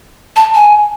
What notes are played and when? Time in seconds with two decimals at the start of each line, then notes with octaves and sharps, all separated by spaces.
0.36 A5
0.55 G#5